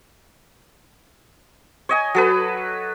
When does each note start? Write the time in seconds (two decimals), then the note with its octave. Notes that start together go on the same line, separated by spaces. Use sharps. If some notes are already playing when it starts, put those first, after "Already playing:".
1.89 C#5 D#5 G#5
2.15 F#3 A4 B4